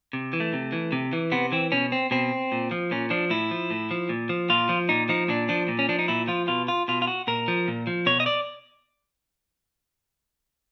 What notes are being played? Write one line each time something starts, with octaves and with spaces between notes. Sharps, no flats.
C3
E3
A3
C3
E3
C3
E3
C3 B3
E3 C4
B2 C#4
C4
B2 C4
A#2
F3
A#2 C#4
F3 D4
A2 E4
F3
A2
F3
A#2
F3
A#2 F4
F3
A#2 D#4
F3 D#4
A#2 D4
F3 D4
A#2
C#4
F3 D4
D#4
A#2 E4
F3 F4
B2 F4
F4
B2 F4
F4
F#4
A#2 A#4
F3
A#2
F3
B2 C#5
D#5
D5